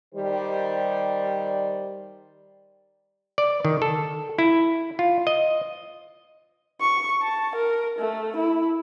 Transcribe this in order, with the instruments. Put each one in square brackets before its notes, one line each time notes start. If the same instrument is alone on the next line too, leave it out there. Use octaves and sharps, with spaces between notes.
[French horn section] D#3 G3 G4 C5 D5
[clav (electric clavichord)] D5
D#3
A4
E4
F4
D#5
[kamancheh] C#6
A5
A#4
A3
E4